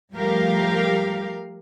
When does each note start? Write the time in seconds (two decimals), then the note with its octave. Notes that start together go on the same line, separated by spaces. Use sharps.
0.14 F3 G3 A3 G4 A#4 F5